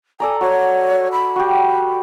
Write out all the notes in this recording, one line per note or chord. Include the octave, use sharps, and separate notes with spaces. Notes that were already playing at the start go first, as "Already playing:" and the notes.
A4 D5 G#5 A#5
F#4 C#5
B5
F#4 G4